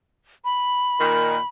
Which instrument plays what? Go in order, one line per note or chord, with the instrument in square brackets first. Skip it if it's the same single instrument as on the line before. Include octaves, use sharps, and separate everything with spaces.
[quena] B5
[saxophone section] A#2 D#3